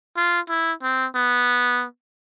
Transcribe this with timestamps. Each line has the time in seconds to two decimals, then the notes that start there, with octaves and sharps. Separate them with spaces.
0.16 F4
0.49 E4
0.83 C4
1.15 B3